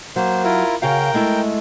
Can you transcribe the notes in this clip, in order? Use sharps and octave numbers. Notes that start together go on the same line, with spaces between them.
F#3 A#3 C5
E4 F4 A#4
C#3 F#4 A#4 F5 G5
G#3 A3 E4